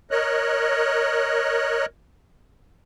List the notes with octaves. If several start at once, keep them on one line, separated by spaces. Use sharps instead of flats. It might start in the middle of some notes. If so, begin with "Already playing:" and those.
A#4 C#5 D#5 F#6